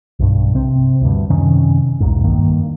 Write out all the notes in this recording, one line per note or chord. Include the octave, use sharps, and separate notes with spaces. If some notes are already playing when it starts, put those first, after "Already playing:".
B1 G2
C3 C4
D2 G2
F#2 C3 D#3 C#4
B1 E2 G#2
G2 D#3 A#3